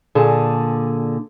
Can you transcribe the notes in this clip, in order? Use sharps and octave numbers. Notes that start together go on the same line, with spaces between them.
A#2 D3 G#4 A5